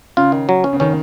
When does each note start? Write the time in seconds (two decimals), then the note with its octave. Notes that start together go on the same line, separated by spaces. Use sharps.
0.17 C#3 F4
0.32 D#3
0.49 F#3
0.64 C#4
0.73 C#3
0.80 D#3 C#4